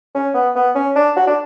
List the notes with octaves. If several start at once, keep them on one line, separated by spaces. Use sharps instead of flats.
C#4
B3
B3
C#4
D4
F#4
D4